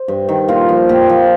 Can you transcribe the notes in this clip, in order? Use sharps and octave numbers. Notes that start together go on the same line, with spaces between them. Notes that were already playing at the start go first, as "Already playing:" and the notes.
Already playing: C5
G2
D#3
A#2 F4
F3
A#2 G4
F3